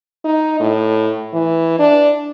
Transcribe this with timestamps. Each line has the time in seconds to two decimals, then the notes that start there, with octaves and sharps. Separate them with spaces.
0.25 D#4
0.60 A2
1.34 E3
1.79 D4